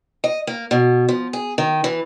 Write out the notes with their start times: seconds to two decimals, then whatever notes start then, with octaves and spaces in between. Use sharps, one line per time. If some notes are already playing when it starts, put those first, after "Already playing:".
0.24 D#5
0.47 A#3
0.71 B2
1.09 F3
1.33 G#4
1.58 D#3
1.84 E3